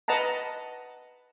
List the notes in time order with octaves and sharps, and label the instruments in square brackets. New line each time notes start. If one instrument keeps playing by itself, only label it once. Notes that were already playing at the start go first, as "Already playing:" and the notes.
[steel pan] B4 D#5 F#5 A5 A#5